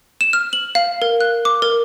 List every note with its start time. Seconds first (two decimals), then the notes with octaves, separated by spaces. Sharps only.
0.21 E7
0.33 F6
0.53 F#7
0.75 F5
1.02 A#4
1.21 F#6
1.45 D6
1.62 A#4